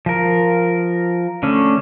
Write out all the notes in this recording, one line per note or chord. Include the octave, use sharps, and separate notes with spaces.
F3 A#4
D3 A3 C#4